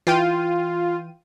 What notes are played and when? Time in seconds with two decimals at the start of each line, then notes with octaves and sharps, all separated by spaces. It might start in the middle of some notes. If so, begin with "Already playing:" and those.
0.07 E3 F4 G5 D#7